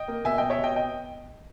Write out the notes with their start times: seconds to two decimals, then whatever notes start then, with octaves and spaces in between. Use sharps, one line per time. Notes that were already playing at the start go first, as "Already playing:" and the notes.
Already playing: D#5 G5
0.08 A#3
0.25 B2 E5 G#5
0.38 B2 D#5 G5
0.50 C#5 E5
0.58 B2
0.63 D#5 G5
0.76 D#5 G5